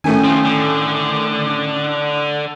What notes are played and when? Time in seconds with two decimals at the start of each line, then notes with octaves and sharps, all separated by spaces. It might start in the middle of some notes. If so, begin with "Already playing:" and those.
0.04 A2 D#3 A3 C#4 A#4 G#5
0.25 C4 F4
0.45 D3